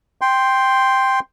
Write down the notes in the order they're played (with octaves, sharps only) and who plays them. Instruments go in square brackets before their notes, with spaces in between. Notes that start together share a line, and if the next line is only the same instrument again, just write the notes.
[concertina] G5 C6